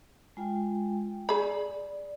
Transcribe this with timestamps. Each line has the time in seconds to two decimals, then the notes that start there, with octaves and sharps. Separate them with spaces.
0.37 G#3 F4 G5
1.29 G#4 D5 B5